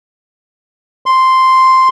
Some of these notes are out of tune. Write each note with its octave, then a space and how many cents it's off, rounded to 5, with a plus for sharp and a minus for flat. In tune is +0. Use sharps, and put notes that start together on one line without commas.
C6 -5